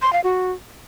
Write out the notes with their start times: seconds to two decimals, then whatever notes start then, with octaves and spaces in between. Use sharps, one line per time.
0.02 C6
0.13 F5
0.24 F#4